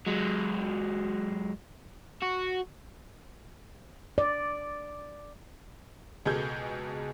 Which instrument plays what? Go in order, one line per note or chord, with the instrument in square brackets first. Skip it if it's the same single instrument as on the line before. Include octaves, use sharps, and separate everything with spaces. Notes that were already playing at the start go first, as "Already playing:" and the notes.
[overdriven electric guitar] F#3 G#3
F#4
[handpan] D5
[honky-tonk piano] C#2 B2 G#4 A4 G6 G#6